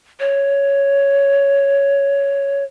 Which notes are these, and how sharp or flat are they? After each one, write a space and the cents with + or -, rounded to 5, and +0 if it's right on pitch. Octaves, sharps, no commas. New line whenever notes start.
C#5 +5